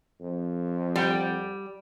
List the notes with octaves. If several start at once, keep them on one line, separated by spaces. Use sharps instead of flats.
F2
G3 D5 F#5 G5